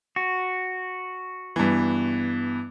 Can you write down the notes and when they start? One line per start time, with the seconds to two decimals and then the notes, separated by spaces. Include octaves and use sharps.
0.16 F#4
1.56 G2 E3 B3